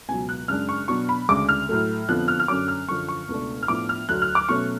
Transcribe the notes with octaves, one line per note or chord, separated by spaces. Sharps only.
C#2 B2 F#3 G#5
F#6
F#2 C#3 G#3 D4 F6
C#6
B2 F#3 B3 D4 C#6
B5
D2 C#3 G#3 D4 D6
F6
A2 F#3 A3
F2 D3 F3 B3 F#6
F6
F6
F#2 D3 F#3 C#4 D6
F6
F#2 D3 F3 C#6
C#6
C#2 B2 A3 D4
F6
A2 F3 B3 D4 D6
F6
D2 D3 F#3 F#6
F6
D6
B2 F#3 A3 C#4 C#6